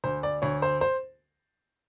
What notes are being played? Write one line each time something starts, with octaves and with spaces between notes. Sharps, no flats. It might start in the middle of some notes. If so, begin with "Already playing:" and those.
D2 C5
D5
D2 C#5
C5
C5